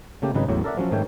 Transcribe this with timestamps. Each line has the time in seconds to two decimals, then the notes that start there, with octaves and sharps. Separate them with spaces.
0.22 C#3 A3 A#3 G4
0.34 G#1 C#3 F#3 D#4 B4 F#5
0.48 A1 E2 A2 F#3
0.64 A4 A#4 D5 E5 F#5
0.77 F3 F#3 C#4
0.91 G#2 D#3 A3 C#5 G5